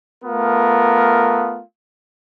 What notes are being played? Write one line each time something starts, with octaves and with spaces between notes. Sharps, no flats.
A3 B3 F4 A#4